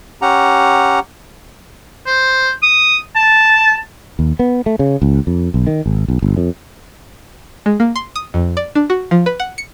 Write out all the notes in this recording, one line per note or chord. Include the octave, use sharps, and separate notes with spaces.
C#4 G4 F#5 A#5
C5
D#6
A5
D#2
B3
A3
C#3
C#2
F2
B1
D#3
G#1
B1
G1
F2
G#3
A#3
C6
D#6
F2
D5
D4
F#4
F3
B4
F#5
C#7